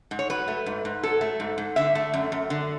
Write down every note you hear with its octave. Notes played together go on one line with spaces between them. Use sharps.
G#2
C#5
F#3 B4
A3
G#2
G#2
F#3 A4
A3
G#2
G#2
D3 E5
A3
F#2
F#2
D3